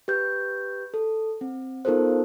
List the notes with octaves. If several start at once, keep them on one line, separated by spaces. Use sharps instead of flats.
G4 B4 G6
A4
C4
B3 D#4 F4 A4 A#4 C5